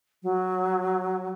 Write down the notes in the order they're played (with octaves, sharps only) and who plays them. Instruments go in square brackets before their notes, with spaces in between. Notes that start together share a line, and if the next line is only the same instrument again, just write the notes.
[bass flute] F#3